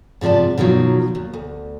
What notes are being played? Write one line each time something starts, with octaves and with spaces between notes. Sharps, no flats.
G#2 C3 F3 D5 A5
B2 D#3 F3 F#3
D#2
D2